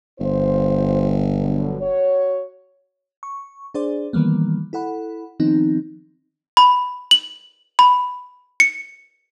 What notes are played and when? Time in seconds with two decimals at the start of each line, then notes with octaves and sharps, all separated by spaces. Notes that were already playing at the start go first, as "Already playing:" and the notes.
0.20 G1 F4 C5
1.37 B2 D3 F#3
1.80 F#4 C#5
3.23 C#6
3.74 D4 G#4 C5 D5
4.13 D#3 E3 G3 A#3 B3
4.73 E4 A4 F#5 B5
5.40 D#3 F3 B3 C4 D#4
6.57 B5
7.11 F#7
7.79 B5
8.60 C#7